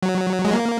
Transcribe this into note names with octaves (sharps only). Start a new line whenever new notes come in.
F#3
G#3
A#3